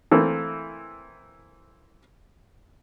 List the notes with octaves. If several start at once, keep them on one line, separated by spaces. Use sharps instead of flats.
E3 A3 A#3 C4 E4